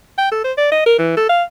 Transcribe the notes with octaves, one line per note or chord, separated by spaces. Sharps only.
G5
A4
C5
D5
D#5
A#4
E3
A4
F5